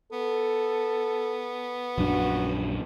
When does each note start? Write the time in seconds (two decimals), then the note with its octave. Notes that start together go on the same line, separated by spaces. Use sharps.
0.13 B3 A4
1.98 A#1 F#2 D4 F#4